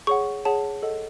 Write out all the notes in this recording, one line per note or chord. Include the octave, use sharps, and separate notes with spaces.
G#4 C#5 F#5 C#6
G#4 C#5 F#5 A5
A4 D#5 F#5